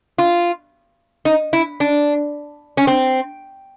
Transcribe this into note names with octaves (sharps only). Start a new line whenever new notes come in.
F4
D#4
E4
D4
C#4
C4